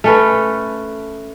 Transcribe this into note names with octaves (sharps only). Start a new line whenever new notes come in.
A3 C#4 B4